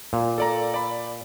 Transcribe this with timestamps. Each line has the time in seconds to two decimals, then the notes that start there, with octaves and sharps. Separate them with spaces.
0.13 A#2
0.38 A4 D5 A#5
0.74 D5 B5